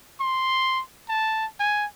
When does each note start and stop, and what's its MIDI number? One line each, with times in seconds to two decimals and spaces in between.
0.21 0.81 84
1.09 1.46 81
1.60 1.86 80